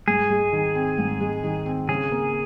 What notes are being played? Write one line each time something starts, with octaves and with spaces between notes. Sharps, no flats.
G#2 G#4
G#3
D#3
C4
G#2
G#3
D#3
C4
C#3 G#4
A#3